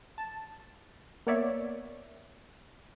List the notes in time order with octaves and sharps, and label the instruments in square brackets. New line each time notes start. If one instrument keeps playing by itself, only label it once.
[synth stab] A5
A#3 B3 C#5 D5 E5